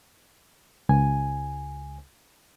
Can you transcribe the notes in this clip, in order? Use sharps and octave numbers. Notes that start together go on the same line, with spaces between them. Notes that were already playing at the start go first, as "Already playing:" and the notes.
C#2 G#5